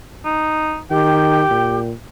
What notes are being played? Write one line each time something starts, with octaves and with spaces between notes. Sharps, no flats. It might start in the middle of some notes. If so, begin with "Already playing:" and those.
D#4
D#3 G4 G5
A#2